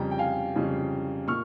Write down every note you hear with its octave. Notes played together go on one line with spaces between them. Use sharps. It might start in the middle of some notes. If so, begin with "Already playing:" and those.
Already playing: F2 C#3 G3 G5 A#5
G5
F5 G#5
F2 C#3 G3
A#2 C#6 F6